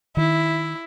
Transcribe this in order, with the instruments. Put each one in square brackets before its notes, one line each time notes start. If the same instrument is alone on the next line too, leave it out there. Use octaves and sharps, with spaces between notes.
[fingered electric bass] D#3 [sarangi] E4